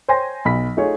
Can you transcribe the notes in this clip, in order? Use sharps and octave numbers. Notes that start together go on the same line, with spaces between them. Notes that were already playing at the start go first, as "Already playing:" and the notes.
C5 C#5 G5 G#5 C6 A#6
B1 B5 B6
A3 D#4 F4 G#4 C#5